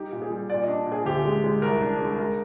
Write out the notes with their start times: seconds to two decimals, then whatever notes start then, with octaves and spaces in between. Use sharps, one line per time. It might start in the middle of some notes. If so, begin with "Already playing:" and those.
Already playing: G3 D#4 G4
0.12 A#2
0.22 G#4
0.31 G3
0.50 A#2 D5
0.63 D4 D#5
0.87 A#2
0.92 G#4
1.05 D2 G4
1.25 G#3
1.44 G#3
1.62 C2 A#4
1.81 D4
2.00 G#3
2.19 G#3 A#4